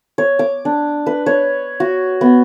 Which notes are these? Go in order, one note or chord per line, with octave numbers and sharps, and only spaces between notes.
C#5
D6
D4
B4
C#5
F#4
B3